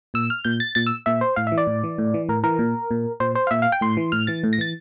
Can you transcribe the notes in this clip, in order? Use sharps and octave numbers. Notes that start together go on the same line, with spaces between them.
A#2 E6
F6
A#2 G6
A6
A#2 A6
E6
A#2 E5
C5
A2 F5
E5
E3
D5
A2
E3
A2
E3
A2 A#4
E3 A#4
A#2
A#2
A#2 C5
C5
F5
A#2 E5
F5
G5
A2 C6
E3
A2 F6
E3 A6
A2
A#6
E3 A6